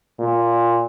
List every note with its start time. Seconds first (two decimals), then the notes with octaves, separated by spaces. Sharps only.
0.19 A#2